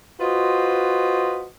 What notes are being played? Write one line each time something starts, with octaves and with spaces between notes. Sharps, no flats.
F4 F#4 B4 C5 D#5